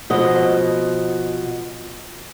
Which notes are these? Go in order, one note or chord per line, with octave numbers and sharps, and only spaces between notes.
B2 F3 D#5